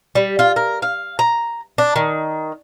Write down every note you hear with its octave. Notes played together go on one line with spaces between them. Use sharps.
G3
F4
A#4
F5
A#5
D4
D#3